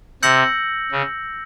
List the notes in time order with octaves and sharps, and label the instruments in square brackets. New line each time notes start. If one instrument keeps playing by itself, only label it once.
[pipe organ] C3 [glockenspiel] E6 G6 A#6 C#7 F#7
[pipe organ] C#3